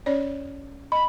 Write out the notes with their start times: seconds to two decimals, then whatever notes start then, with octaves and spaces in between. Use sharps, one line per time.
0.06 C#4 C#5 D5
0.92 D#5 B5